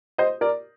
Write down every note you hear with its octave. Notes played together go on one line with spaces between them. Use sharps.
C5 D#5
A#4 D5